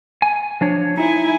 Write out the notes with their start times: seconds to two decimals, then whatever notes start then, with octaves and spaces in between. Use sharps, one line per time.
0.22 G#5
0.61 F3 D4 C#5
0.97 D#4 E4 G#5